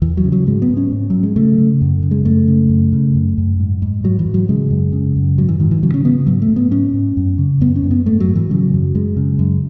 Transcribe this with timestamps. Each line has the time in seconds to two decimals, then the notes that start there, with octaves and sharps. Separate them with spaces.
0.02 E2 E3
0.17 F#3
0.24 C#3
0.32 F#3
0.47 G#2 G#3
0.62 B3
0.70 G#2
0.77 C#4
0.92 G#2
1.10 G#2 F#3
1.23 G#3
1.36 C#3 A3
1.58 C#3
1.81 F#2
2.03 C#3
2.11 G#3
2.25 F#2 A3
2.48 C#3
2.69 F#2
2.93 C#3
3.15 F#2
3.38 F#2
3.60 G#2
3.82 G#2
4.04 G#2 F#3
4.19 E3
4.26 G#2
4.34 F#3
4.49 C#3 G#3
4.70 F#2
4.93 C#3
5.16 F#2
5.38 G#2 F#3
5.49 E3
5.60 G#2 D#3
5.71 E3
5.83 C#3 F#3
5.94 C#4
6.04 C#3 B3
6.27 G#2 F#3
6.42 A3
6.49 G#2
6.56 B3
6.71 G#2 C#4
6.93 G#2
7.17 F#2
7.38 C#3
7.61 F#2 B3
7.76 C#4
7.83 F#2
7.91 B3
8.06 G#2 A3
8.20 F#3
8.29 G#2
8.35 E3
8.50 C#3 F#3
8.73 F#2
8.95 F#2 G#3
9.17 C#3
9.39 F#2